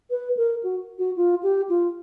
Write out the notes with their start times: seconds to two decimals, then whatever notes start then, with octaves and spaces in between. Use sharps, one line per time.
0.10 B4
0.37 A#4
0.63 F#4
0.98 F#4
1.16 F4
1.43 G4
1.69 F4